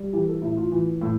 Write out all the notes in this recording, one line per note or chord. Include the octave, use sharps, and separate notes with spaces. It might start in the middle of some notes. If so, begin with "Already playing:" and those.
Already playing: G3
E3 G4
A4
A2 E4
F4
E3
A2